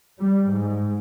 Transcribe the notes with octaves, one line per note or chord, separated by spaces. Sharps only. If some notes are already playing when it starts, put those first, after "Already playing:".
G3
G#2